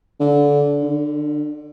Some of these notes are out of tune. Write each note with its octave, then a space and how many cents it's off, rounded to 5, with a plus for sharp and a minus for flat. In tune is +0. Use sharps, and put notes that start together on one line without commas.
D3 -25
D3 +30